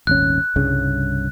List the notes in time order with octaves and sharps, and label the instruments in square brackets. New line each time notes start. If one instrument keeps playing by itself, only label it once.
[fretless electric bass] D#1 G#1 C#4 [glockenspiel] F#6
[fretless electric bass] C2 G2 C#3